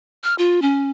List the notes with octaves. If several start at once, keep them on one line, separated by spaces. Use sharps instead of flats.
F6
F4
C#4